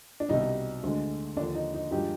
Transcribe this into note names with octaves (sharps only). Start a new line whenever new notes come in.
D4
C2 B2 G3 D#4
D2 D3 G#3
D#2 D3 F3 D4
D#4
D#4
G2 F3 G#3 D#4 G4